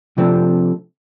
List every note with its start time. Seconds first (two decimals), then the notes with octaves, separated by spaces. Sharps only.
0.18 C3 F3 A3 C4 D4